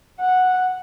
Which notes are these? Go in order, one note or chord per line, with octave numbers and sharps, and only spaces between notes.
F#5